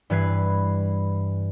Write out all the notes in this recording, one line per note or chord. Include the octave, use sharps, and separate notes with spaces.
G2 E3 B4 G#6 C7